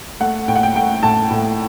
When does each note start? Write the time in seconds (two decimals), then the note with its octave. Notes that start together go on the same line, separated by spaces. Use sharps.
0.20 A3 F#5
0.48 A2 G5
0.55 F#5
0.63 G5
0.75 A3 G5
1.03 A2 A5
1.31 A2